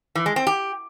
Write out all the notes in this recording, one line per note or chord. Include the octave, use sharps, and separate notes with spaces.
E3
G#3
C4
G4